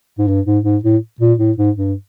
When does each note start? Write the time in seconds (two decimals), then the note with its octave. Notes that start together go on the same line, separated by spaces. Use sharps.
0.18 G#2
0.28 G2
0.46 G#2
0.64 G#2
0.84 A2
1.21 A#2
1.39 A2
1.57 G#2
1.76 G2